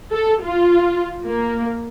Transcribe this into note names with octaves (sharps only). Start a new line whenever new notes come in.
A4
F4
A#3